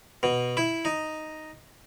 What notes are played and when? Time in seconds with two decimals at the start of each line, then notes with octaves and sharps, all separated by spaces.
0.23 B2
0.57 E4
0.85 D#4